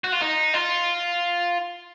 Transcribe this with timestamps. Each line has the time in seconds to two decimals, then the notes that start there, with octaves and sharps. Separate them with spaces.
0.04 F#4
0.12 F4
0.21 D#4
0.54 F4